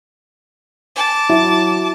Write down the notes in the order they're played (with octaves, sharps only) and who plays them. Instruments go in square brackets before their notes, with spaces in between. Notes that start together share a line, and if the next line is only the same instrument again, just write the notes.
[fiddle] A5 D6
[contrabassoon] F#3 [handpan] E4